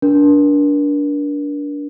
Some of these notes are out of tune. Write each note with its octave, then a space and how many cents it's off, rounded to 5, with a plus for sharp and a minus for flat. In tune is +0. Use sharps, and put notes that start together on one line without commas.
D4 -20 A#4 +40